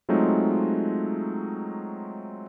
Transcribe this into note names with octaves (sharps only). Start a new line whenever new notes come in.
F#3 G#3 A3 C4 D#4 F4